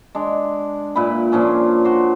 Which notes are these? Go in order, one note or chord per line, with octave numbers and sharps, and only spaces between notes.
G#3 D4
A#2 E4 B4 B5
A#2 F3 C#4 D4
F#4 C6